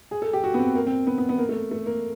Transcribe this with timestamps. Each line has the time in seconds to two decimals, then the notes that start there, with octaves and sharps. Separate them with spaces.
0.11 G#4
0.22 A4
0.33 G4
0.44 F#4
0.54 B3
0.59 C4
0.75 A#3
0.87 C4
1.07 B3
1.18 B3
1.29 B3
1.39 A#3
1.49 A3
1.71 A3
1.86 A#3